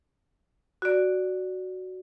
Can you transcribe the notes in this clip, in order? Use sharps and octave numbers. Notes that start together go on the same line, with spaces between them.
F#4 D5